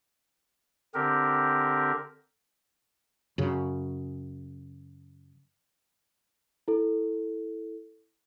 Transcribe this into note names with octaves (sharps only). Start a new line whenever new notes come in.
D3 C4 G4 A#4
F#2 C#3
E4 A4